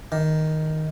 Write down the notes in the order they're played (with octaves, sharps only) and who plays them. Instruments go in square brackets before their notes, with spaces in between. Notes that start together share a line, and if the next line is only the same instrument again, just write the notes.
[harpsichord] D#3